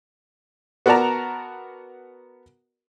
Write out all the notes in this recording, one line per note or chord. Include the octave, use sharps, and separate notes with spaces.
B3 F#4 A#4 D5 A5 A#5